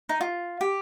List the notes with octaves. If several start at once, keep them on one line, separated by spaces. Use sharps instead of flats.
D#4
F4
G4